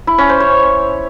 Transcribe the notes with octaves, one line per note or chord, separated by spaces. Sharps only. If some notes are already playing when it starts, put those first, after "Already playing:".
E4
C#4
C5
C#5